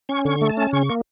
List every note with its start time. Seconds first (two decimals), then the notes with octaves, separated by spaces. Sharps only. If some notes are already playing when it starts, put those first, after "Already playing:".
0.09 C#4 C#6
0.25 D3 C#6
0.41 A3
0.49 A5
0.57 C#4
0.73 C#3 C#6
0.90 A#3